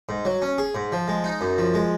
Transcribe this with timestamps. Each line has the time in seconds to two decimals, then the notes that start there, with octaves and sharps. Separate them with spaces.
0.09 G#2
0.25 F#3
0.42 C#4
0.58 G#4
0.75 G#2
0.92 F3
1.08 G#3
1.24 D#4
1.41 F#2
1.58 F3
1.74 G#3